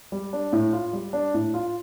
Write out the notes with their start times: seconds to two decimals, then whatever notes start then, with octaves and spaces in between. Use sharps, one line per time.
0.12 G3
0.33 D4
0.53 A2
0.73 F4
0.93 G3
1.13 D4
1.34 A2
1.54 F4